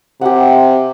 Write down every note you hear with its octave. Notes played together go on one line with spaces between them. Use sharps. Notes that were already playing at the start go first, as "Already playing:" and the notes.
C3 G4 F#5